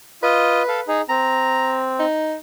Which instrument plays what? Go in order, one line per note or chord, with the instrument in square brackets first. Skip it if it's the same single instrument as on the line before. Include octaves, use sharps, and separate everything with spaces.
[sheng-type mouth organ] F4 D#5 [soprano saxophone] B4
[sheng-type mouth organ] A4 F5
D#4 G#4
[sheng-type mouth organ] C4 [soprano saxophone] A#5
[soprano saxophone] D#4